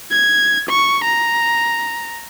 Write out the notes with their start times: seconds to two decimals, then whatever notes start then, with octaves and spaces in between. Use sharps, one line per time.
0.11 G#6
0.69 C#6
1.04 A#5